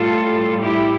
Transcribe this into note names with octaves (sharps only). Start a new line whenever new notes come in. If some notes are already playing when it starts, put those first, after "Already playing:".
Already playing: A2 G3 F4 A4
E4 G4